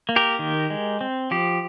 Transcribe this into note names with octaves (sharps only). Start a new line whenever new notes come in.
A#3
G4 A#4
D#3
G#3
C4
F3 G4